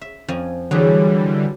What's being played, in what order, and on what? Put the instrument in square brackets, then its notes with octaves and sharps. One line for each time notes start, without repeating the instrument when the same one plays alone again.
[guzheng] E5
F2 F3 G#5
[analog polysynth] D3 E3 G3 [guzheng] F#3 G#4